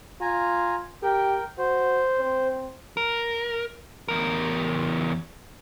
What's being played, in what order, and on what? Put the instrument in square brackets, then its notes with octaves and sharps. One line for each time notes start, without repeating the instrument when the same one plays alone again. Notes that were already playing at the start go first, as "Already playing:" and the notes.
[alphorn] F4 [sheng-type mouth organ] G#5 A#5
[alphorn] G4 [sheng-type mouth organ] A#4 G5
[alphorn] F#4 [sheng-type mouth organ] C5
[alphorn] C4
[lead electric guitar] A#4
E2 A#4